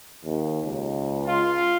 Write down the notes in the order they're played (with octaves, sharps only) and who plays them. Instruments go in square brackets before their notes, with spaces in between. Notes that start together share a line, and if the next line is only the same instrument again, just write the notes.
[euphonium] D#2
C#2
[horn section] F4